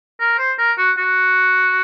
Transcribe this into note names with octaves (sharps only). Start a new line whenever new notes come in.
A#4
C5
A#4
F#4
F#4